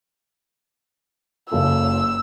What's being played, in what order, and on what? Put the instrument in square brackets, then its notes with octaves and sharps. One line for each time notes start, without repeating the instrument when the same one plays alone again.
[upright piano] F#1 C#3 A4 [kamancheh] E6